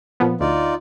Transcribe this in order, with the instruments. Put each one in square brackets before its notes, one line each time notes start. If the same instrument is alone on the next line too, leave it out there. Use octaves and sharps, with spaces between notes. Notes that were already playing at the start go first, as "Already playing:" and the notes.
[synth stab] A#2 F3 B3
[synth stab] D2 [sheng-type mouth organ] D#4 F4 D5